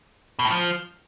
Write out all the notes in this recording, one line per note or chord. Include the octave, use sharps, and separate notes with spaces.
B2
A2
F3